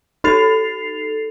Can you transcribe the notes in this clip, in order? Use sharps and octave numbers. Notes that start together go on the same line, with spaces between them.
D#4 A4 A6 C7 F7